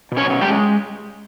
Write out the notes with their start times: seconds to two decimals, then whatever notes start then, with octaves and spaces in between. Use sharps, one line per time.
0.12 B2
0.17 C#4 C#5
0.30 C#4
0.41 G3 G4
0.48 G#3